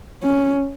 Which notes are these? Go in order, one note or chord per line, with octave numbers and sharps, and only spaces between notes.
C#4